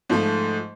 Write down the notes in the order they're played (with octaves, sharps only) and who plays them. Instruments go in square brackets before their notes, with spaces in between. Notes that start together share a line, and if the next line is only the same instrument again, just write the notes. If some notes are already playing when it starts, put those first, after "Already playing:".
[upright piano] G#2 F3 A3